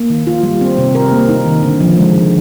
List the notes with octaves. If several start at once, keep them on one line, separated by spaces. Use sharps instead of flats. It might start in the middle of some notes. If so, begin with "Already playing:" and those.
Already playing: A#3
D#3
F4
G3
C4
C3
A#4
A#3
D#4
D#3
D3
F3
G#3
D3